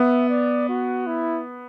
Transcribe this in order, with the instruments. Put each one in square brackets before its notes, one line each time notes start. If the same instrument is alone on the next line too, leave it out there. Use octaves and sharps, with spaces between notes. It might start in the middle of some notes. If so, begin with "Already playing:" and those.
Already playing: [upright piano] B3 [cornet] E5
[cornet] D5
F#4
E4